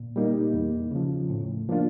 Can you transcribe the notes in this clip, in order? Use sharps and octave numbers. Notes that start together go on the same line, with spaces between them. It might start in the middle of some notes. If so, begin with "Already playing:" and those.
Already playing: A#2
G3 A#3 D#4
E2
C#3 F3
A2
F3 A#3 D4 F4